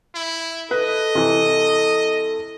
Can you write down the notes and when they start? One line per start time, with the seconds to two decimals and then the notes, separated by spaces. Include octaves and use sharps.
0.15 E4
0.71 A4 B4 D#5
1.15 C3 E3